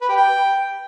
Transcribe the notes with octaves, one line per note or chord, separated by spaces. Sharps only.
B4
G4
G5